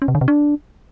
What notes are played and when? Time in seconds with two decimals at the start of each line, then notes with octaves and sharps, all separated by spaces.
0.02 C#4
0.08 C3
0.15 D3
0.21 C3
0.28 D4